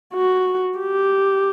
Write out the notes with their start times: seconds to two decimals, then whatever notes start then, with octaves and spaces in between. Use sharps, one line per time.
0.14 F#4
0.79 G4